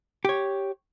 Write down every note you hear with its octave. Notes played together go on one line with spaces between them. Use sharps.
G4 C#5